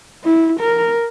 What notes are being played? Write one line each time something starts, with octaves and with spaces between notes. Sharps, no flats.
E4
A#4